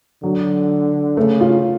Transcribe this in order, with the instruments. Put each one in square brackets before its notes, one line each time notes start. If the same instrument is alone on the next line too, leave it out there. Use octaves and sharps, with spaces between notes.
[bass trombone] D3 [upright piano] F#3
[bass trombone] C#3 [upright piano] A3
[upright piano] F4